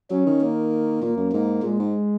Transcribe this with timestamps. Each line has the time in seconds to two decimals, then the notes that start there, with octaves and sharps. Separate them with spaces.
0.11 F#3 C#4
0.26 D#3
0.41 A#3
1.02 A#2 A#3
1.17 F#2
1.32 G#2 A#3
1.63 A#2 G#3
1.79 G#2